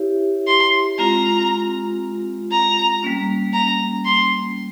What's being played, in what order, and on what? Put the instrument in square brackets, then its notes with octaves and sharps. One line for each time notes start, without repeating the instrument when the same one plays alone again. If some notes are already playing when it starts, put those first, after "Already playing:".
Already playing: [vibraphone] E4 G4 C#5 E5
[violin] C6
[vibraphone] G#3 C4 F4 [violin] A#5
[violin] A#5
[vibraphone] G3 A#3 C#4
[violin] A#5
C6